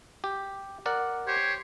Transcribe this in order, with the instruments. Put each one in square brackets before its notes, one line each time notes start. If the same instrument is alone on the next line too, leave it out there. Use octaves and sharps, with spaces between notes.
[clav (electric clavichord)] G4
A#4 D5 F#5
[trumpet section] G4 C5 C#5